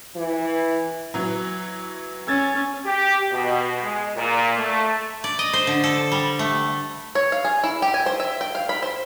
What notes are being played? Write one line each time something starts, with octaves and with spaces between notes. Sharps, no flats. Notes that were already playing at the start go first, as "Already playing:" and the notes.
E3
E3 F#3
C#4 E6 G#6 A6
G4
B2
G#3
A#2
A3
D5
D#5
C5
D3
A4
G3
A3
C#5
F5
G#4
E4
G4
G#5
C5
E5
G5
F5
B5
C5